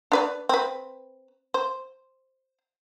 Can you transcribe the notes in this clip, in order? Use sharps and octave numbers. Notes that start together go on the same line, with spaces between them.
D4 B4 D5
C4 B4
C5